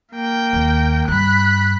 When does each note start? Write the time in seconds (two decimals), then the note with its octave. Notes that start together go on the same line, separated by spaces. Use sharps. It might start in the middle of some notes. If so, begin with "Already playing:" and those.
0.13 A#3 G5
0.53 D#2
1.08 G2 B5 F#6